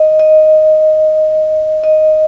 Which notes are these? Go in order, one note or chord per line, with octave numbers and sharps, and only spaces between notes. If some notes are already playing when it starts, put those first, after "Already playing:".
Already playing: D#5
D#5
D#5